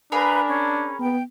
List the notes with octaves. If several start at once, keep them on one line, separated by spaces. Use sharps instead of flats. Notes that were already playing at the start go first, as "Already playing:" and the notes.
D4 G#4 A#4 B4 F5 B5 D#6
C#4
B3 G5